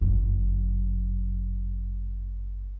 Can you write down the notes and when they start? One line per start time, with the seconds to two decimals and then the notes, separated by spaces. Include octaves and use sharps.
0.01 G1 F#2